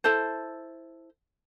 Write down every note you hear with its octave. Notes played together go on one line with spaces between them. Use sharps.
E4 A4 C5